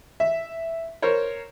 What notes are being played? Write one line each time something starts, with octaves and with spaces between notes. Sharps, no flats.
E5
A#4 C5 C#5